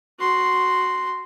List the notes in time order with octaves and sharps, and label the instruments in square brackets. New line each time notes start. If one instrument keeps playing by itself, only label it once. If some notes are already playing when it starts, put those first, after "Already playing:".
[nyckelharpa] F#4 C6